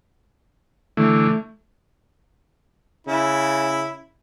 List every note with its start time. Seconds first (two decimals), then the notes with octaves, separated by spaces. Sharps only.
0.97 D3 E3 A3
3.07 C#3 E4